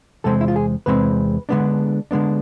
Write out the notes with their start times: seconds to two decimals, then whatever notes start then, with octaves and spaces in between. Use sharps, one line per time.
0.24 E2 C3 G#3 C4 A4
0.41 E4
0.48 F4
0.56 G#4
0.86 E2 C3 G#3 C4 B4
1.49 D3 G#3 B3 D4
2.11 D3 G#3 B3 D4